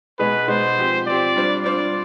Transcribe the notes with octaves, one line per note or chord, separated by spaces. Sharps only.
B2 G#3 B3 D#4 G#4 B4
B2 G#3 B3 D#4 G#4 C5
F3 C4 G4
F3 C4 G4 D5
G3 D4 F4 C5
G3 D4 F4 C5 D5